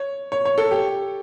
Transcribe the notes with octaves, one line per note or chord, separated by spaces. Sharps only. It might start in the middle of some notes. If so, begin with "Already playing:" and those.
Already playing: C#5
C#5
C#5
A4
G4